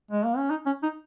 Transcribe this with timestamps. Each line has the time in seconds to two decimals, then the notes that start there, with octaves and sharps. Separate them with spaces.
0.11 G#3
0.25 A#3
0.37 C#4
0.50 D#4
0.66 C#4
0.83 D#4